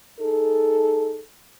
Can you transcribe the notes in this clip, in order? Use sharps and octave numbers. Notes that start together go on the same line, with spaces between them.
D#4 G#4 A4